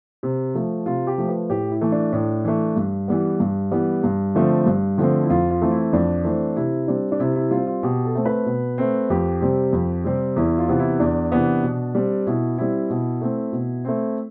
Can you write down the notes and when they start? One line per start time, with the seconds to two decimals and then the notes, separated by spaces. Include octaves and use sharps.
0.23 C3
0.54 F3 A3
0.86 C3 F4
1.07 G4
1.18 F3 A3
1.28 B4
1.50 A2 G4
1.71 E4
1.81 E3 A3
1.92 D4
2.13 A2
2.45 E3 A3
2.76 G2
3.08 E3 G3 B3
3.40 G2
3.71 E3 G3 B3
4.04 G2
4.35 D3 F3 A3 C4
4.66 G2
4.98 D3 F3 A3 C4
5.23 E4
5.29 F2 F4
5.50 F4
5.61 E3 A3 C4
5.72 E4
5.93 F2 D4
6.24 E3 A3 C4
6.56 C3 E4
6.88 G3 C4 D4
7.12 D4
7.20 C3 E4
7.36 E4
7.51 G3 C4 F4
7.67 F4
7.83 B2 G4
8.05 A4
8.15 A3 C4
8.25 B4
8.46 B2
8.78 A3 C4
9.10 F2 G4
9.41 C3 G3 C4
9.73 F2
10.04 C3 G3 C4
10.36 E2 E4
10.58 F4
10.68 C3 E3 B3
10.79 E4
11.00 E2 D4
11.32 C3 E3 B3
11.63 B2
11.95 G3 C4
12.26 B2 E4
12.58 G3 C4 E4
12.90 B2
13.21 A3 C4
13.53 B2
13.85 A3 C4